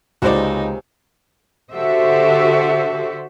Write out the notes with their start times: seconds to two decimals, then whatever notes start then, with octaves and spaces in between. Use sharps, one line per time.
0.22 C#2 C3 A#3 C#4 D#4 F#4 C5 D5
1.74 D3 F#4 G4 A4 C5 E5